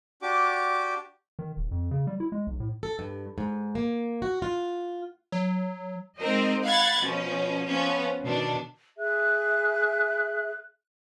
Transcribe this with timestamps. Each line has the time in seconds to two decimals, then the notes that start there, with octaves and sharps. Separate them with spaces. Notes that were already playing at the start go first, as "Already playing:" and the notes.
0.22 D4 F#4 G4 D6
1.39 D#3
1.57 D#1
1.71 F2
1.91 C#3
2.07 G3
2.20 E4
2.32 G#3
2.47 B1
2.60 A2
2.83 A4
2.99 G2
3.38 G#2
3.75 A#3
4.22 F#4
4.42 F4
5.32 F#3
6.19 G#3 C4 D#4 A#4 C5 D#5
6.64 F5 F#5 B5 F#6 G#6 A6
7.01 B2 F3 C#4
7.67 F3 B3 C#4
8.22 B2 D#3 D4
8.99 G#4 E5 F#6